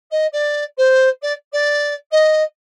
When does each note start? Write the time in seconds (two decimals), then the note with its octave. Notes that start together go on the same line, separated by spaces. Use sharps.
0.11 D#5
0.32 D5
0.77 C5
1.22 D5
1.52 D5
2.11 D#5